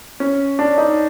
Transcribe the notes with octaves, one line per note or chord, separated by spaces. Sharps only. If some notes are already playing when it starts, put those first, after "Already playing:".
C#4
D4
D#4